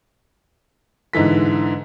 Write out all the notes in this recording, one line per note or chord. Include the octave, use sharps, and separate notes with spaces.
G#2 D3 E3 B6